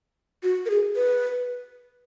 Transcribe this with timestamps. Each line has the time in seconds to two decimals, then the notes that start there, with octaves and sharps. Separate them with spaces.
0.43 F#4
0.66 A#4
0.70 G#4
0.96 B4